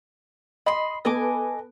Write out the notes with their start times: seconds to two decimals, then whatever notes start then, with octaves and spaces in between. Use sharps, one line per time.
0.66 D#5 B5 C6
1.05 B3 A4 B4 D#5 G#5 D6